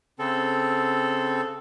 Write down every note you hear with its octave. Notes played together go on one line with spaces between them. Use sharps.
C#3 C4 A4